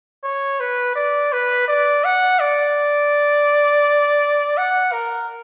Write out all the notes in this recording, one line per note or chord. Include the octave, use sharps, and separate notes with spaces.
C#5
B4
D5
B4
D5
F#5
D5
F#5
A#4